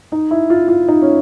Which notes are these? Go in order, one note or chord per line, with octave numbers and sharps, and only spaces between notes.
D#4
E4
F4
F4
D#4
C#4